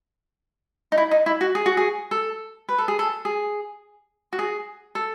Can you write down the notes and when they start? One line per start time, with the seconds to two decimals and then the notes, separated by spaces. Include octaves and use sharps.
0.92 D#4
0.98 E4
1.11 D#4
1.26 E4
1.41 F#4
1.55 G#4
1.66 F#4
1.77 G#4
2.11 A4
2.69 B4
2.78 A4
2.88 G#4
2.99 A4
3.25 G#4
4.33 F#4
4.39 G#4
4.95 A4